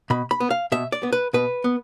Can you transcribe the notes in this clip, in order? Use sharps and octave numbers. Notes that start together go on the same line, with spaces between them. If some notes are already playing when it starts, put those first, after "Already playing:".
B2 B5
B5
B3
F5
B2 E5
D5
B3
B4
B2 B4
B3